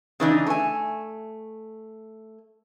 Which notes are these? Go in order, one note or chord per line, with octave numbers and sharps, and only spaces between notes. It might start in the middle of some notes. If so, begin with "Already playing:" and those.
C#3 E3 D4 D#4
A3 G#5